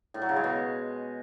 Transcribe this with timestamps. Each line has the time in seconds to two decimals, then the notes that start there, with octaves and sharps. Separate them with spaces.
0.14 A2
0.22 F#3
0.29 C#3
0.36 G#3
0.44 B2